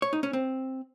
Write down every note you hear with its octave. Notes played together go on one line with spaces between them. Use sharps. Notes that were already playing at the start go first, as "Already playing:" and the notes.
C#5
D#4
C#4
C4